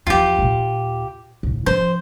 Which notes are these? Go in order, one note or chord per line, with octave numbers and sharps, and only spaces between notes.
E2 F3 F4 G4
D#2 A#2
D2 A2
F3 C#4 C5